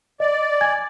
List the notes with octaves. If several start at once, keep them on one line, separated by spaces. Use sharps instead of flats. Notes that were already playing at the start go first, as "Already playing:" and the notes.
D5 D#5
G#5 G#6